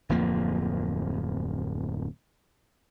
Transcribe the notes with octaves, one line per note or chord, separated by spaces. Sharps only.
D1 F2 F3 A#3